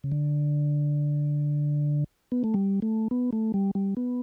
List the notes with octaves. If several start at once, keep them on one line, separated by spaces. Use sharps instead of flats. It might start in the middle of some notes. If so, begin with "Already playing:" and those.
C#3
D3
B3
A3
G3
A3
B3
A3
G3
G3
B3